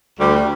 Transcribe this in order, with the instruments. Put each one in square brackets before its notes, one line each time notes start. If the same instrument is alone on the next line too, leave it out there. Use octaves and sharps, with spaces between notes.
[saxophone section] D2 G3